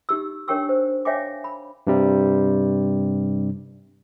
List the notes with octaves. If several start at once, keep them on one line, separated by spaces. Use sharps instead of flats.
D#4 G4 E6
D4 A#4 C#5 G5 C#6 E6
C5
C#5 E5 F5 G5 G#5 D6
B5
G2 C3 G3